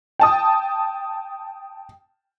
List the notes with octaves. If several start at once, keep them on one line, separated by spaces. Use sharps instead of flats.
G5 A5 D#6